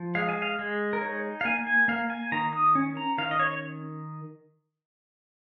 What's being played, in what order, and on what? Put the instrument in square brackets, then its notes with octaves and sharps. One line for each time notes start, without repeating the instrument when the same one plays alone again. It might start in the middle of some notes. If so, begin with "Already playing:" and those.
Already playing: [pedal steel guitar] F3
G#3 F5
G#5
F5
G#3
A#4
D#4 C#5
F5
A#3 G#5
G#5
A#3 F5
G#5
D#3 A#5
D#6
C#4
A#5
D#3 F5
D#5
C#5